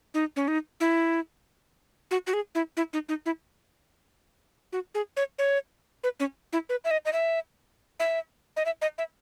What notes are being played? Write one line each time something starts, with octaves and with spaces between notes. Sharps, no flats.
D#4
C#4
D#4
E4
F#4
F#4
G#4
E4
E4
D#4
D#4
E4
F#4
G#4
C#5
C#5
B4
C#4
E4
B4
E5
D#5
D#5
E5
E5
D#5
E5
D#5
E5